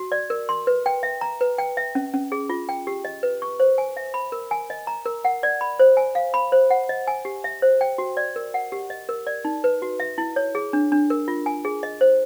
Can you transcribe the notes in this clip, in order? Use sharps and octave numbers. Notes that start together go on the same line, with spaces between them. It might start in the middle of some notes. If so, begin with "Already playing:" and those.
Already playing: F#4
D5
A#4
C6
B4
G5
E5
A#5
B4
G5
E5
C#4
C#4
G#4
F4
G5
G4
D#5
B4
C#6
C5
G#5
E5
B5
A#4
G#5
D#5
A#5
A#4
F#5
D5
B5
C5
G#5
F5
B5
C5
F#5
D#5
G#5
G4
E5
C5
G5
F#4
D5
A#4
F#5
G4
D#5
A#4
D5
D#4
B4
F#4
E5
E4
C#5
G#4
D4
D4
A#4
F4
G#5
G#4
D#5
C5